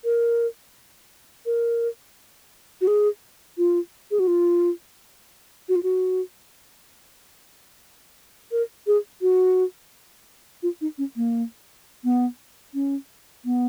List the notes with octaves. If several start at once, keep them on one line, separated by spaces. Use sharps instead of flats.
A#4
A#4
F#4
G#4
F4
G#4
F#4
F4
F#4
F4
F#4
A#4
G#4
F#4
F4
D#4
C#4
A#3
B3
C#4
B3